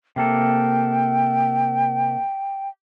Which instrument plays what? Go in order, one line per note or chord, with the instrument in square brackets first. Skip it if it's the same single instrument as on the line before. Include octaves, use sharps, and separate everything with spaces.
[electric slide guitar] C3 A#3 A4 [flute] G5